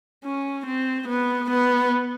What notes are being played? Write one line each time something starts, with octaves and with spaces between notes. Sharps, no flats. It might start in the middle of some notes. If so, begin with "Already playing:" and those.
C#4
C4
B3
B3